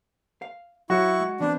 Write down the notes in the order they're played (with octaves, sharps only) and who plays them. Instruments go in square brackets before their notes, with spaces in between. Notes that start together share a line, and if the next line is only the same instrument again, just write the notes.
[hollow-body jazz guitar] F5
[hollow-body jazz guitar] F#3 [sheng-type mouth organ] E4 C#6 [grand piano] F#4
[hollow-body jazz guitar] G#3
[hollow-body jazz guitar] E3 B3 C4 [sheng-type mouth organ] D4